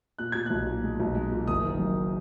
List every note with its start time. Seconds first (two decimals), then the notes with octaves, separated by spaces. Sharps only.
0.18 A#2 F#6
0.32 A#2 G#6
0.46 B1 F#6
0.67 A#2
0.84 G#3
1.00 B1
1.15 G#3
1.32 A#2
1.47 F#1 D#6
1.63 D#3
1.79 F#2